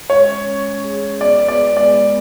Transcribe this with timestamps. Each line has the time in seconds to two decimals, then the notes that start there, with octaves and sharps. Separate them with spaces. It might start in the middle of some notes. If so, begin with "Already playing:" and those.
0.10 G#3 C#5
0.28 C#4
0.48 C#4
0.66 G#3
0.83 G#4
1.02 G#4
1.21 B3 D5
1.40 B4
1.48 D5
1.58 G#3
1.76 G#3 D5
1.94 B3